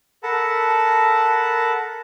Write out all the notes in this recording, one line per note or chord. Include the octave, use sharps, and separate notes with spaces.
A4 A#4 F#5 A5 B5